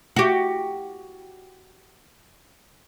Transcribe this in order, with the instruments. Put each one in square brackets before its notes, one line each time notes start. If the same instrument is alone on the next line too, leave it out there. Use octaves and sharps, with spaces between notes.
[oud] F#4 G4